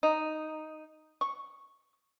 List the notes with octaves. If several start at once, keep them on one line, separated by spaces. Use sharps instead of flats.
D#4
C#6